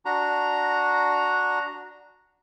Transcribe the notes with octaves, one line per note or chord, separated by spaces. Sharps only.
D4 F#4 A#5